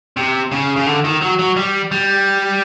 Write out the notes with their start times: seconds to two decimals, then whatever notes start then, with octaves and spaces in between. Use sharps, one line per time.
0.17 C3
0.52 C#3
0.76 C#3
0.86 D3
1.05 D#3
1.21 F#3
1.39 F#3
1.57 G3
1.92 G3